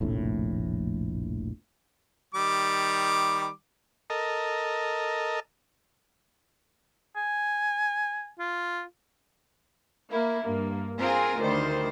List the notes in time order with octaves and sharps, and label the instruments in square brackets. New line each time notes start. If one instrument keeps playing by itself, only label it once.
[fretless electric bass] F1 A#1 A2
[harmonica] D#3 G3 D6
[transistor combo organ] A4 A#4 D#5
[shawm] G#5
F4
[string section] A#3 E4
G2 A#3
C4 F4 G#4 A#4
D2 D#3 G3 C5